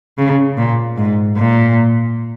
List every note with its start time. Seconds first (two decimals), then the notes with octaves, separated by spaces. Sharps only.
0.18 C#3
0.58 A#2
0.97 G#2
1.37 A#2